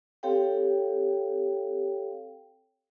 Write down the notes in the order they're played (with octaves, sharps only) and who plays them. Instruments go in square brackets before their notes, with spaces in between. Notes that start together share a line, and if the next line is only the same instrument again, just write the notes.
[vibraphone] C4 G4 A4 C#5 F5 G5